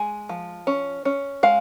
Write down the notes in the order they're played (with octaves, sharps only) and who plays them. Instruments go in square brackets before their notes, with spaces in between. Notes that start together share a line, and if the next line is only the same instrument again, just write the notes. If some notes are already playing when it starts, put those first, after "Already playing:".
Already playing: [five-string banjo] G#3 G#5
F3
C#4
C#4
G#3 F5